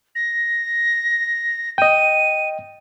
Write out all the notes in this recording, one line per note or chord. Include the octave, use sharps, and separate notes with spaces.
A#6
D#5 G5 D#7